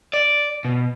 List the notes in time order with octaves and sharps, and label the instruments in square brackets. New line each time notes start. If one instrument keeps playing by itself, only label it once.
[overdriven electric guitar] D5
B2